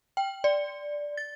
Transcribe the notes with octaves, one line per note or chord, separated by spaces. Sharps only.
G5
D5
A6